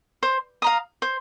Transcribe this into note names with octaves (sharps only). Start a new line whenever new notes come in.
C5
F5 A#5 D#6
C5